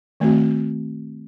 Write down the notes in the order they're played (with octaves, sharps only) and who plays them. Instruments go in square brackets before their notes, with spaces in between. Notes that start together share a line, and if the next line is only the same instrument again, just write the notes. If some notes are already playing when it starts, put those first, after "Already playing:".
[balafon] D#3 A3 C4 F#4